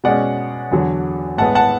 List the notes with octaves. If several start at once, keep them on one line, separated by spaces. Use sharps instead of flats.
B2 G#3 C#4 D5 F#5
E2 D3 F#3
A2 G#3 B3 F#5 A5
F#5 A5